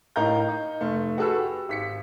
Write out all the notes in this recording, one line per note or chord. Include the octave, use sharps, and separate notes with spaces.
A2 D#4 A#4 F5 A#5 G6
D#4
F1 A3
F#4 G#4 A4 B4 E6
G4
G#1 B6 C#7